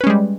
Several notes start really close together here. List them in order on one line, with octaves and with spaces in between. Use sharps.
B4 C#4 G#3 G3